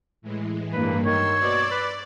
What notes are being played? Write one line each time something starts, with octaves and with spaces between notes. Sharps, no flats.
A2 E3 G#3
G2 A#3 B4
D#3 C#5 C6 E6
B2 D5
B4